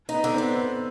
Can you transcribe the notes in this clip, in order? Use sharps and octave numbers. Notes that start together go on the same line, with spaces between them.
D#4
B3
D3
B3 C4